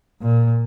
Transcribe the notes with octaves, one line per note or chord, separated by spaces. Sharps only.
A#2